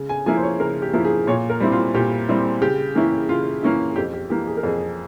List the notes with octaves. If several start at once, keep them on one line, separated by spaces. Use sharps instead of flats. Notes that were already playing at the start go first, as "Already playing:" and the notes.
Already playing: C#3
G#5
F3 A#3 E4 G#5
C5
C#5
C#3 A#4
G4
F3 A#3 E4
G#4
A#2 C#5
A#4
G3 C4 E4
F4
A#2 G4
G3 C4 E4
C#3 G4
E3 A#3 C#4 E4
C#3 F4
E3 A#3 C#4 E4
F2 G4
G4
E3 A#3 G4
G#4
A#4
F2 G#4